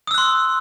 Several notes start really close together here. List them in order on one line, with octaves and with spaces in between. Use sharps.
D#6 E6 F#6 C6